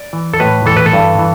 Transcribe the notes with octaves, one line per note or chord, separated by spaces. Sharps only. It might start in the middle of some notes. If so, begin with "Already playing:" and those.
Already playing: D5
E3
A4
A2 B4
E3 A4
B4
A4
G2
E3